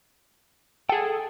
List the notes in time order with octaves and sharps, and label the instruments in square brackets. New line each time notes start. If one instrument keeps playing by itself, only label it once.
[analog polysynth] G#4 A4 [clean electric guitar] F#5 G5